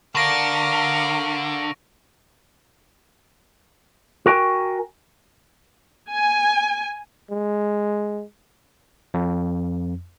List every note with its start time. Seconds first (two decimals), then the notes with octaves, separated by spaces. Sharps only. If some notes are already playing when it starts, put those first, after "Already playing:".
0.15 D3 A#4 F5 C#6 D6 A#6 D7
4.26 F#4 A#4 G5 G#5
6.12 G#5
7.31 G#3
9.14 F2